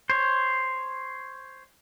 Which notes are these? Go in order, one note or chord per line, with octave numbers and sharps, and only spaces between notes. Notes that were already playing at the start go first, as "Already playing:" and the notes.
C5 C#5